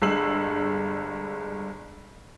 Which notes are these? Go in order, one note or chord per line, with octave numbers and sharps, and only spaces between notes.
G1 G2 G#3 E6 C7 F#7